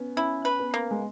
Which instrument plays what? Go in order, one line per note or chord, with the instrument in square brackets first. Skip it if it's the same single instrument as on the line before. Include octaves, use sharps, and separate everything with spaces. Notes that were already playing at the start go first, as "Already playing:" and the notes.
Already playing: [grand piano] B3 C#4
[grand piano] C#4 [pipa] E4
[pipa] B4
[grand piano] B3
[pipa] A#3
[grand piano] G#3